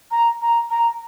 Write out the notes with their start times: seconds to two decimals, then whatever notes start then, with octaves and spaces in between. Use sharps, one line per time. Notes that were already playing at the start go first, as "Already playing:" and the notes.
0.11 A#5
0.41 A#5
0.70 A#5